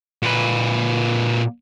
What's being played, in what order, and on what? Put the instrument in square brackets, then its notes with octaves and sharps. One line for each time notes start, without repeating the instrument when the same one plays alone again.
[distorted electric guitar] A#2 B4